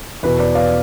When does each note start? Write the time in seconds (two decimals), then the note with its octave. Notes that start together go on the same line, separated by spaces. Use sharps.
0.23 E2 B2 B4
0.39 B4 D5
0.55 D5 F5